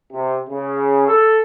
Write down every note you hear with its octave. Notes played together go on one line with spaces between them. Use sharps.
C3
C#3
A4